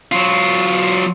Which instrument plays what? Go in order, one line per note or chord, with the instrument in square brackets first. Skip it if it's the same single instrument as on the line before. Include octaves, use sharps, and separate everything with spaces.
[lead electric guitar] F#3 F4